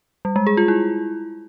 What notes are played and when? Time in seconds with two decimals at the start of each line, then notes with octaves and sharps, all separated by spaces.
0.25 G3
0.36 G#3
0.47 G#4
0.57 F4
0.68 E4